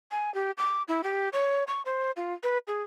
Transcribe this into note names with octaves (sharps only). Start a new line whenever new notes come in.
G#5
G4
D6
E4
G4
C#5
C#6
C5
F4
B4
G#4